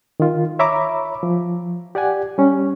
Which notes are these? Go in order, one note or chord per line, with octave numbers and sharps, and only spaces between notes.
D#3 F4
C#5 E5 A#5 B5 D6
F3
G4 D5 F#5 G#5
G3 C#4